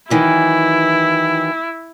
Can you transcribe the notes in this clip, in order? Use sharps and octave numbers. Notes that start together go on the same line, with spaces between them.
D#3 E3 F#3 E4